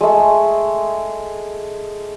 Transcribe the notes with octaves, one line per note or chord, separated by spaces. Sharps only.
G#3 A3